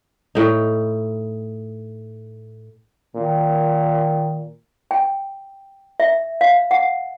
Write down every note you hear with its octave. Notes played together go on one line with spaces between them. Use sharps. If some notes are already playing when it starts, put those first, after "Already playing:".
A2 D#4
A#2 D#3
G5
E5
F5
F#5